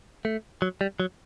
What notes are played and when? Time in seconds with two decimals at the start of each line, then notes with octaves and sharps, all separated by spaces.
0.25 A3
0.62 F#3
0.81 G3
1.00 F#3